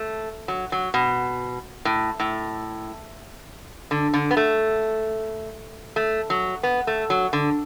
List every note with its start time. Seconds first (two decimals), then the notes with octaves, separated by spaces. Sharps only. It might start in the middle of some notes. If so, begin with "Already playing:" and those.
Already playing: A3
0.48 F#3
0.72 F#3
0.94 B2
1.85 A2
2.20 A2
3.91 D3
4.14 D3
4.31 B3
4.37 A3
5.96 A3
6.30 F#3
6.63 B3
6.87 A3
7.10 F#3
7.33 D3